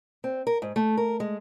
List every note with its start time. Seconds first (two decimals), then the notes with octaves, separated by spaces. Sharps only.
0.24 C4
0.47 A#4
0.62 G#2
0.76 A3
0.97 A#4
1.20 G#3